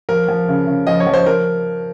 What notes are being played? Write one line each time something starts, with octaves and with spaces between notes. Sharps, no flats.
F3 A#4
F3
C#3
C#3
F3 D#5
C#5
F3
C5
F3 A#4